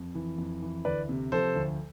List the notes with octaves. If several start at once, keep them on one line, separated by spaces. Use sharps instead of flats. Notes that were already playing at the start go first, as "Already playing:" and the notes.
Already playing: F2
E3
F2
E3
D2 B4 D5
C3
F3 A4 C5
D2